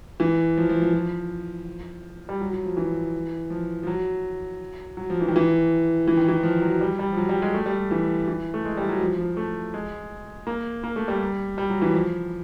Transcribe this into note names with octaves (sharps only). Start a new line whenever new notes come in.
E3
F3
F3
F3
F3
G3
F#3
F#3
F3
E3
F3
F3
F#3
F#3
F3
E3
D#3
E3
E3
D#3
E3
F3
F#3
G3
G3
F3
F#3
G3
G#3
A3
G3
E3
E3
A3
G#3
G3
F#3
F3
F3
A3
G#3
A#3
A#3
A3
G3
G3
F#3
E3
F3